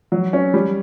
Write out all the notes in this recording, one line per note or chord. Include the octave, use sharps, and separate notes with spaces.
F#3
C#4
G3